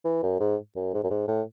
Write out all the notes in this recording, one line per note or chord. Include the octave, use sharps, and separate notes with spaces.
E3
F#2
G#2
F#2
G#2
F#2
G#2
A2